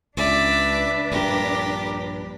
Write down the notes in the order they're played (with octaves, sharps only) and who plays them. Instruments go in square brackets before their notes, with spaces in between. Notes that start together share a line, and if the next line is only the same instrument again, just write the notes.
[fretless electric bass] C#2 [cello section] D4 B4 [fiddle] D5 E5
[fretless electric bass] A#1 G2 [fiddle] G4 A#4